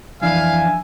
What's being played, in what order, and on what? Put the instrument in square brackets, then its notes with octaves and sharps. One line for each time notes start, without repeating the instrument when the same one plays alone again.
[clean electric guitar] F2 E3 D4 [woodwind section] E5 G#5 [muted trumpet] F5